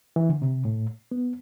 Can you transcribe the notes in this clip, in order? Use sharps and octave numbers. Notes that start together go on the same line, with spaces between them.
E3
D3
C3
A2
B3